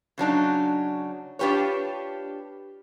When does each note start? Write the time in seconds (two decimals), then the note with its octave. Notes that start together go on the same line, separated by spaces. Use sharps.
0.18 C#3 F#3 D4 D#4
1.39 D4 F4 G4 B4 C#5